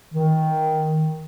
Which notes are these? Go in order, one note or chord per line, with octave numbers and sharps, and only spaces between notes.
D#3